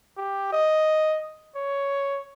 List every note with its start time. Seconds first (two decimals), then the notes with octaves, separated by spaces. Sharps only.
0.17 G4
0.53 D#5
1.55 C#5